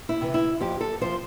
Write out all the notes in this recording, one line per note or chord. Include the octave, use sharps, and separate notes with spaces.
E4
C3 E3
E4
F2 G4
A4
C3 F3 C5